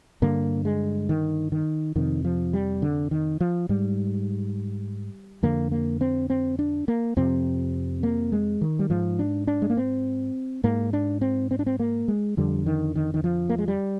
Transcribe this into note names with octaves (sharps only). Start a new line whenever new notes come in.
G2 D3 A#3
G#3
D#3
D#3
F2 C3 D#3
F3
G3
D3
D#3
F3
G#2 G3
F2 D3 A#3
A#3
C4
C4
D4
A#3
F2 C3 C4
A#3
G#3
D#3
G3
G#2 F3
D4
D4
G#3
A#3
C4
G#2 A#3
D4
C4
C4
D4
C4
A#3
G#3
F2 D3 G3
D#3
D#3
D#3
F3
A#3
G#3
G3